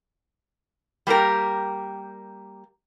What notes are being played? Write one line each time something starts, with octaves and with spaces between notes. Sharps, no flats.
G3 A#3 G4 A#4